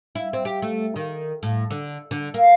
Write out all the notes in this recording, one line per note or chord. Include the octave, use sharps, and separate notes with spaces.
E4
C4
G4
A3
D#3
A2
D3
D3
A#3